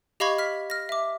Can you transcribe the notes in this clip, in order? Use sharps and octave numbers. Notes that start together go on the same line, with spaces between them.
G4 D#5 F5 B5 C#6 G#6
F6 B6
F6 A#6
E5 D6